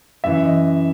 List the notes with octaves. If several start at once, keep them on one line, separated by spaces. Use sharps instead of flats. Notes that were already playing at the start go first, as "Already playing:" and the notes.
F#2 E3 E5
D#5